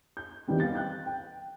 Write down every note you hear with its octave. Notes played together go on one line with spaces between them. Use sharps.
G6
E2 D#3 G3 C4
F5 A6
G5 F#6 G6
G5